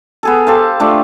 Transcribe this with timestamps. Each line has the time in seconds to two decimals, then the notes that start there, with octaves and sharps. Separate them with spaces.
0.23 B3 G#4 A4
0.47 G4 A4 C5 F5
0.80 A3 D4 F4